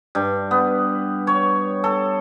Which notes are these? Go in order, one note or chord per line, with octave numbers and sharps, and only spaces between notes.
G2
B3
C#5
A4